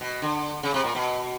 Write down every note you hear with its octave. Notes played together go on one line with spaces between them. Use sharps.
B2
D3
C#3
C3
A#2
B2